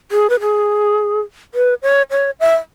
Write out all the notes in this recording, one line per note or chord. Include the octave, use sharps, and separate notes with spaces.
G#4
B4
G#4
B4
C#5
C#5
E5